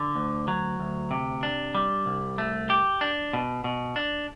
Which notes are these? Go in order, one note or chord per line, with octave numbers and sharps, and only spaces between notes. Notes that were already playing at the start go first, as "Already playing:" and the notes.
Already playing: D3
D2
F#3
D2
C3
D4
G3
C2
A3
G4
D4
B2
B2
D4